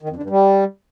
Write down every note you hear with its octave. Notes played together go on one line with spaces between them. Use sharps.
D#3
F2
D3
G2
G3